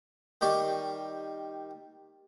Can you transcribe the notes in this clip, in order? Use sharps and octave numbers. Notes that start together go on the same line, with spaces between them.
D#3 G3 G4 C#6